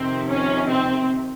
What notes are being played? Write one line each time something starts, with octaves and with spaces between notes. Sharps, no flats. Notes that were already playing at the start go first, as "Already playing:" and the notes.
Already playing: F2 C3 D#3 C4
C#4
C4